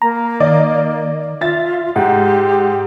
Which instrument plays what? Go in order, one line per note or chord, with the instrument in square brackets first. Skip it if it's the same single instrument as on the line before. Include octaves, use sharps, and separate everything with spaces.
[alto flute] A#3 [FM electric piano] A#5
[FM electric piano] D#3 [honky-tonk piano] D5 D#5
[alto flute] F4 [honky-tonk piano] E5 A6
[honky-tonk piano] G#2 [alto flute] G4 [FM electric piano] F#5